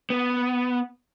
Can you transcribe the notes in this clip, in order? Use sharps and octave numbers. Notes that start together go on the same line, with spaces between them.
B3